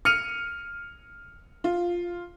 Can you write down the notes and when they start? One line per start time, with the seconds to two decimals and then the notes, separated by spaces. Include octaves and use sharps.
0.05 F6 C#7 D#7 F7
1.64 F4